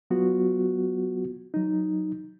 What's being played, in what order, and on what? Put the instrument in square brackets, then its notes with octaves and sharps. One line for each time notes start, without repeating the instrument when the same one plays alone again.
[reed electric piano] F#3 B3 F4 F#4
F#3 D#4